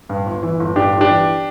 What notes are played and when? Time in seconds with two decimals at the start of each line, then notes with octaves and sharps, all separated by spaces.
0.09 G2
0.26 G1
0.43 E3
0.60 G1
0.76 G2 D4 G4
0.92 G1
1.01 D4 G4
1.09 E3